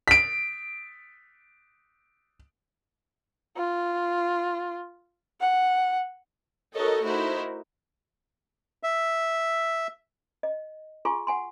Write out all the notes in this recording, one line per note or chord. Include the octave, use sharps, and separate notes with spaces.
B6 D7
F4
F#5
D#4 F#4 A4 A#4 C#5 D#5
A3 D#4 E4 F#4 A#4 C5
E5
D#5
F4 G#4 G#5 C6 C#6
F#5 G#5 C6